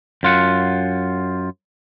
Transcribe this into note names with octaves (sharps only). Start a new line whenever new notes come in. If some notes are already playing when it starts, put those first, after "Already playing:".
F#2 F4 F#5